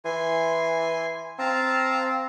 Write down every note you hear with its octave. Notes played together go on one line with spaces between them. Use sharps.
E3 G#5 C6
C4 F5 A5 A#5